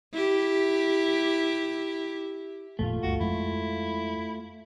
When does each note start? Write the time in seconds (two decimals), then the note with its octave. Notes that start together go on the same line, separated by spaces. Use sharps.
0.13 E4 G4
2.79 G#1 F2 A#2 A3 F4
3.03 G1 D2 G2 F#4
3.21 F2 G#3 E4